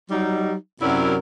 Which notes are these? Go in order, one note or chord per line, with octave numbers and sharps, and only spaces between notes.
F#3 G3 D#4
F#2 C3 F#3 E4 A#4 D5